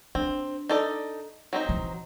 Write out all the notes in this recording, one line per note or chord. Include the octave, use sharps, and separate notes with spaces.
C4 D4
D#4 A4 D5
F#3 C4 D#4
E3